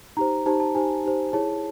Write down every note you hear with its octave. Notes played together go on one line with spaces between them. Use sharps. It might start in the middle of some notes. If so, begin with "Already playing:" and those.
D#4 G4 C5 A#5
D#4 G4 C5 A5
A5
D#4 G4 C5 G#5
D#4 G4 C5
E4 G#4 C#5 A5